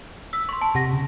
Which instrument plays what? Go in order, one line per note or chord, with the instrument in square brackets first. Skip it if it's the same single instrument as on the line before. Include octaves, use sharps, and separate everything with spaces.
[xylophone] E6 B6
C6 C#6
A5
[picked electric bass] C3 [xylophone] G4 F#5 A#6
[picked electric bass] C#3